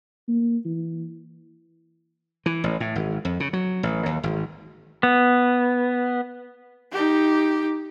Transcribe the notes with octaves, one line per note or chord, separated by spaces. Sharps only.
A#3
E3
E3
A1
A2
G#1
F2
C#3
F#3
A1
D#2
G#1
B3
D#4 G4